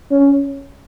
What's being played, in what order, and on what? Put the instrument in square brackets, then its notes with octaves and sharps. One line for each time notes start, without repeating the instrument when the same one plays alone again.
[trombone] C#4